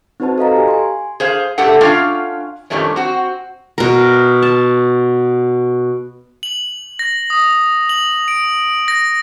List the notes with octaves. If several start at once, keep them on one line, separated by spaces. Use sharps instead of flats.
C4 D#4 F#4 B4 C5 A5
A4 D#5 F5 A#5
G4 G#5
G#5 C6
G#4 C5 F5
A2 A3 G4 A4 F#5
C#4 D4 F4 F5 G5
F2 A#2 D#3 G3 A3 C#4
C4 F#4
B2 A#4
A5
F#7
A#6
D#6
F#7
D7
A#6